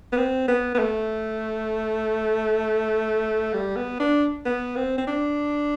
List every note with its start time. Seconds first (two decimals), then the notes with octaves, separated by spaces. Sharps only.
0.12 B3
0.17 C4
0.48 B3
0.75 B3
0.79 A3
3.54 G3
3.76 B3
4.00 D4
4.45 B3
4.76 C4
4.98 C4
5.07 D4